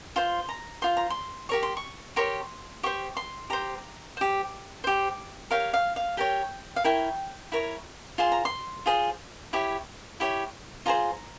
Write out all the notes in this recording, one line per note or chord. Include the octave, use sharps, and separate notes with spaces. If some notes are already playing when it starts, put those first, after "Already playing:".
F4 C5 C6
A#5
F4 C5 C6
A#5
C6
G4 A#4 C#5 C#6
C6
C#6
G4 A#4 C#5 C6
G4 C5 C#6
C6
G4 C5 A#5
G4 C5
G4 C5
G4 A#4 C#5 F5
F5
F5
G4 A#4 C#5 G5
F5
E4 A#4 C#5 G5
E4 A#4 C#5
F4 G#4 C5 C6
A#5
C6
F4 G#4 C5
E4 G4 C#5
E4 G4 C#5
F4 G#4 C5 A#5